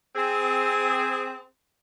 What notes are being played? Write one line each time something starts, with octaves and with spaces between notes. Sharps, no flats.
C4 G#4